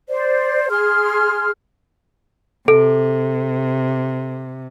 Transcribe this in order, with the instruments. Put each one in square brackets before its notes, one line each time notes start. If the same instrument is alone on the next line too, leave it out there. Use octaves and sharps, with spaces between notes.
[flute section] C5 D5
G#4 C6 F6
[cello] C3 [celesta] A4